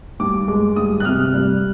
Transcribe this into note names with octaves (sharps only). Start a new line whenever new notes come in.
G2 D6
G#3 D6
G2 D#6
F#6
C3 F6
G3